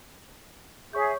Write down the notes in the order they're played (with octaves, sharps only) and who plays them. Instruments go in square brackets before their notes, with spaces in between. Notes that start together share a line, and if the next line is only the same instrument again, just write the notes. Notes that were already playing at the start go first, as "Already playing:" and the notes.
[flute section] G#4 E5 [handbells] C#5 C#6 G6